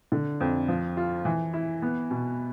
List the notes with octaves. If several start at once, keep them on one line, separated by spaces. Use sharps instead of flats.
D3
F2
F3
F4
E3
E4
B3
B2